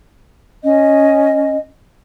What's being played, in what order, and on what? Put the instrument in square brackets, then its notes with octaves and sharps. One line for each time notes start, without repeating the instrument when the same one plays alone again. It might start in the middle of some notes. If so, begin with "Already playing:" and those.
[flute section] C#4 D#5